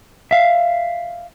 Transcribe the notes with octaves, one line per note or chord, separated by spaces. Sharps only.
E5 F5